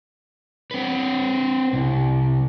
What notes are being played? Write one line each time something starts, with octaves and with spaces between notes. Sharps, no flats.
C4 B4
C2